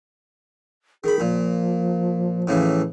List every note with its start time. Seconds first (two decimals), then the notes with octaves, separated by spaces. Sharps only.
1.04 D#3 G#4 B5
1.20 A#2 F3
2.47 A2 C#3 E3